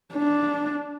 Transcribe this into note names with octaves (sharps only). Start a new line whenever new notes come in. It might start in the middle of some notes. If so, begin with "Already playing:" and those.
D4